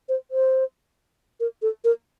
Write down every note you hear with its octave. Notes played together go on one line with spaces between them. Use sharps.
C5
C5
A#4
A4
A#4